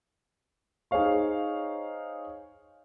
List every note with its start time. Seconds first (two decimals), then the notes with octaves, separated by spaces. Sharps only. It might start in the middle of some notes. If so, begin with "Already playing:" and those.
0.91 D#4 G#4 C5 C#5 F5 C#6